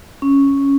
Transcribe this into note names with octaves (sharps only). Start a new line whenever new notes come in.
C#4